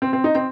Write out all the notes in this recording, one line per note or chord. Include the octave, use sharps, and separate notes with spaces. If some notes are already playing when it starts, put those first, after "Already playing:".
C4
C4
D#4
C4